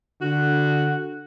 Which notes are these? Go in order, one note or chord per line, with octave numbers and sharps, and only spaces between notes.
D3 F#4